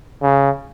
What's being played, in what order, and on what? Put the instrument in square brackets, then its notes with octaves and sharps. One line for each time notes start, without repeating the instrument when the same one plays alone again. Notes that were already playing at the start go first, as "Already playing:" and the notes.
[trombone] C#3